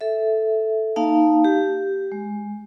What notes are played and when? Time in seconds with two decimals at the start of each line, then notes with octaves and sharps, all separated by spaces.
0.01 A4 E5
0.96 A#3 D#4 F5 A5
1.44 G4
2.12 G#3